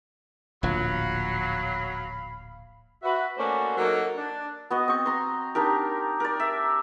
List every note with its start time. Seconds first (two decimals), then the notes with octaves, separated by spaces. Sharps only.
0.63 D1 A#1 F3 F#3 F5 B5
3.02 F#4 B4 E5
3.37 A3 A#3 C#4 F#4 C5 D5
3.76 F#3 A#3 D#4 A4 A#4
4.16 D4
4.70 B3 F#4 D#5
4.88 C4 C#6
5.06 A#5 C6
5.55 D4 D#4 G4 A#4
6.20 A#4 D5
6.40 E5